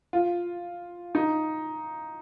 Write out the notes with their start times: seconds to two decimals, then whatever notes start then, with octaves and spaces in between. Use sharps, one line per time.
0.13 F4
1.15 D#4